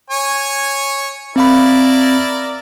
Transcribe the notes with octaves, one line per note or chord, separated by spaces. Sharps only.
C#5 G#5
C4 E4 A#4 D5 F5 B5